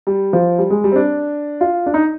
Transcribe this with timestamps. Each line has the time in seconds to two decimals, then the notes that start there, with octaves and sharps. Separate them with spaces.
0.07 G3
0.33 F3
0.58 G3
0.70 G#3
0.84 G3
0.92 C4
0.96 D4
1.61 F4
1.86 D4
1.94 D#4